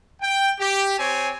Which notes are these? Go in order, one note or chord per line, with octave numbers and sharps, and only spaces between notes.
G5
G4
C4 C#5 G#5